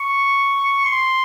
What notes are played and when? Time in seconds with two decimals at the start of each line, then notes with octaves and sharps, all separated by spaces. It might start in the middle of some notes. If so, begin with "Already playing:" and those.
Already playing: C#6
0.86 C6